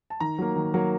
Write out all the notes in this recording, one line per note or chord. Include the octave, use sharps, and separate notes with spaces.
A5
D#3 A#5
F#3 A#3
D#3
F#3 A#3